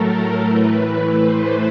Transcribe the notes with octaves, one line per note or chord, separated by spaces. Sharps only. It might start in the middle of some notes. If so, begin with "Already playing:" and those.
Already playing: A2 F#3 A3 A4 A#4
A2 E3 A3 B4
C5